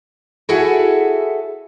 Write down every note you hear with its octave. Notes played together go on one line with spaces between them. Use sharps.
E4 F#4 G#4 A4 E5 F#5